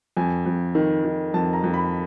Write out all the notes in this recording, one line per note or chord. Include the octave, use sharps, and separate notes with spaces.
F2 G#5
F2
D#3
D#3
F2 A5
A#5
F2
B5